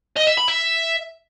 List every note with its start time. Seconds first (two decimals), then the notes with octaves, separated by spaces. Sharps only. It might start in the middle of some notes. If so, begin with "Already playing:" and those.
0.16 D#5
0.27 E5
0.38 B5
0.48 E5